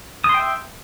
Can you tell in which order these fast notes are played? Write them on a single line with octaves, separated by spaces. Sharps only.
D#6 C6 G5 E5